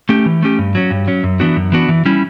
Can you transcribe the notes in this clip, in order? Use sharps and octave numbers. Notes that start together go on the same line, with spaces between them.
A3 C#4 G4
E3
A3 C#4 G4
G2
F#3 C#4
G2
F#3 C#4
F#2
E3 B3 D4 F#4
F#2
E3 B3 D4 F#4
E3
G3 C#4 E4